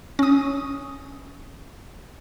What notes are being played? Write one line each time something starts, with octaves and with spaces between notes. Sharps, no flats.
C#4 D#6